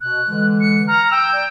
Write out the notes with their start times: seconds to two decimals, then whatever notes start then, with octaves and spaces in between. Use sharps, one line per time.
0.01 B2 F#6
0.29 D3 E3 G#3
0.61 C#7
0.87 A#5 F6
1.11 G5 E6
1.33 D5